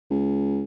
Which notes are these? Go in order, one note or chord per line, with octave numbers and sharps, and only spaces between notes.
C#2